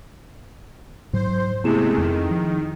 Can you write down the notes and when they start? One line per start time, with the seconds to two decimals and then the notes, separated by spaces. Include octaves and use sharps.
1.13 G#2 F#3 C5
1.64 C3 G#3 A3 B3 C4 E4 G#4 E7
1.98 F2 D#3
2.31 F3